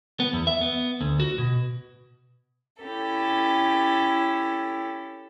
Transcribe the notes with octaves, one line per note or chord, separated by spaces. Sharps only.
B3
E2
E5
B3
D2
F#4
B2
C#4 E4 G4 A4